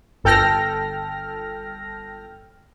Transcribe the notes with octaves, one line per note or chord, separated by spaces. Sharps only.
G1 A4 G5 F6 A#6